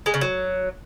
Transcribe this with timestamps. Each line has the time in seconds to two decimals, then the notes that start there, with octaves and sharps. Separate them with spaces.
0.06 G#3
0.14 C#3
0.21 F#3